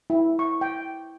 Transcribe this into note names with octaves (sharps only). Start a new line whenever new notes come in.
E4
C#6
G5